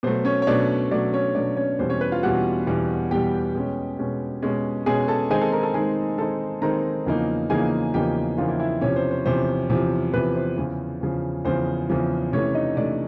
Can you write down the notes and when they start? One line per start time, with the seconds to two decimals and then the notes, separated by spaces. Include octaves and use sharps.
0.03 B2 F#3 A3 C5
0.25 C#4 C#5
0.42 C#5
0.47 B2 F#3 A3 D4 D5
0.91 B2 F#3 A3 D4 D5
1.13 C#4 C#5
1.35 B2 F#3 A3 D4 D5
1.57 C#4 C#5
1.79 E2 B2 G3 C5
1.90 C#4 C#5
2.01 B4
2.12 F4 F5
2.23 E2 B2 G3 F#4 F#5
2.67 E2 B2 G3
3.11 E2 B2 G3 G4 G5
3.55 B2 G#3 C#4
3.99 B2 G#3 C#4
4.42 B2 G#3 C#4
4.86 B2 G#3 C#4 G#4 G#5
5.08 A4 A5
5.30 D#3 G#3 C4 D#4 G#4 G#5
5.41 A4 A5
5.52 A#4 A#5
5.63 A4 A5
5.74 D#3 G#3 C4 D#4 G#4 G#5
6.18 D#3 G#3 C4 D#4 A4 A5
6.62 D#3 G#3 C4 D#4 A#4 A#5
7.06 E2 C#3 F3 A#3 D#4
7.50 E2 C#3 F3 A#3 D#4 G#4 G#5
7.94 E2 C#3 F3 A#3 D#4 G4 G5
8.38 E2 C#3 F3 A#3 D#4 F4 F5
8.48 E4 E5
8.60 E4 E5
8.81 E2 C3 F3 C#4 C#5
8.96 C5
9.11 C5
9.25 E2 C3 F3 C5
9.70 E2 C3 F3
10.14 E2 C3 F3 B4
10.36 C5
10.58 E2 C#3 F3
11.01 E2 C#3 F3
11.45 E2 C#3 F3 C5
11.90 E2 C#3 F3
12.33 C3 E3 A3 C#4 C#5
12.55 D#4 D#5
12.77 C3 E3 A3 D4 D5